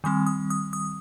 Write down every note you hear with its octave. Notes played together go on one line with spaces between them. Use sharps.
D#3 G3 C4 D#6
D#6
D#6
D#6